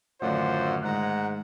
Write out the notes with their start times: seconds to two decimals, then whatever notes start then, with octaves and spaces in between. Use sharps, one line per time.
0.22 F#2 A2 D3 D#3 F4 C5 D5 F#5
0.84 G#2 G#3 F#5 A#5 F#6